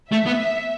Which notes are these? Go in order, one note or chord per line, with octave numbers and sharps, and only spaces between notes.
A3 E5
B3